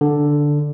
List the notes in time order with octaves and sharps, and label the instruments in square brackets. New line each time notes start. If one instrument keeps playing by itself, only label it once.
[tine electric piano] D3